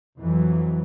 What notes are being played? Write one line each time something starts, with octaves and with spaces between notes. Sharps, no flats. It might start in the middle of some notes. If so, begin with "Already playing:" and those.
F2 E3 F#3